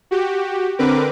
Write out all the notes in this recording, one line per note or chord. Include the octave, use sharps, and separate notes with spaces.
F#4 G4
D3 C4 A#4 B4 D6